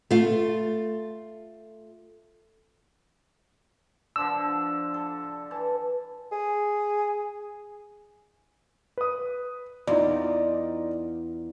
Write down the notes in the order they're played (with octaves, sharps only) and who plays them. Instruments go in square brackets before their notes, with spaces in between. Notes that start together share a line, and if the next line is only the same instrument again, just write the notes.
[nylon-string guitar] A3 F4
[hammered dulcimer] D3 F3 D4 [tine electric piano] E6
[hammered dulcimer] A4
E3 A5
[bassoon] G#4
[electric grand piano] B4 D#6
[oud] E2 [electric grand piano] D#4 F4 D5